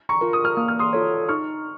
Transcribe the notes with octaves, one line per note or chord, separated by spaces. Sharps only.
A#5 C#6
F4 A#4
D#6
F6
A#3 D#6
F6
C6 D#6
F4 A4 C#5
D#4 C#6 F6